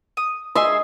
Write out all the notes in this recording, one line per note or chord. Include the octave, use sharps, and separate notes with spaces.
D#6
G#4 D#5 E5 C6